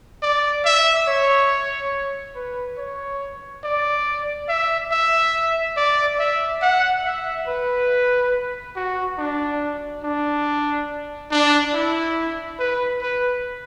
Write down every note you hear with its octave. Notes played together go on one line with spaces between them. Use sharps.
D5
E5
C#5
B4
C#5
D5
E5
E5
D5
E5
F#5
E5
B4
F#4
D4
D4
D4
E4
B4
B4